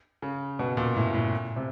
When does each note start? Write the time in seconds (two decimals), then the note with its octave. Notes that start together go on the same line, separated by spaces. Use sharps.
0.22 C#3
0.59 B2
0.77 A#2
0.96 A2
1.14 A2
1.56 C3